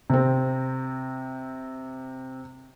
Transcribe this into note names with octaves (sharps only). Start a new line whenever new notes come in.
C3 C4